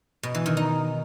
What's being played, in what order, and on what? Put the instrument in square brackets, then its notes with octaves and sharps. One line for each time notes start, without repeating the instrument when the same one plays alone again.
[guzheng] B2
E3
D#3
D#4